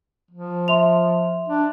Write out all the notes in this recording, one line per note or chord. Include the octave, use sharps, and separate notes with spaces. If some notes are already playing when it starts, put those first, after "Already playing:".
F3
E5 C6 F7
D4